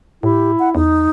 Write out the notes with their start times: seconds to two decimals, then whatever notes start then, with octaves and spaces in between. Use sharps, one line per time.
0.23 A2 E4 G4
0.59 F#5
0.75 E2 D#4